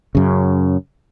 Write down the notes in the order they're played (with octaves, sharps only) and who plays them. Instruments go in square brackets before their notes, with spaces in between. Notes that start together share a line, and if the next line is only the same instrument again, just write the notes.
[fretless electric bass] F#2 C#3